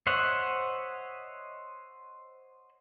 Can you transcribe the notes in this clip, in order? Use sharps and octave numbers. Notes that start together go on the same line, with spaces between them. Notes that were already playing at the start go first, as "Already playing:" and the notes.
C5 C#5 D#5 E5 F#5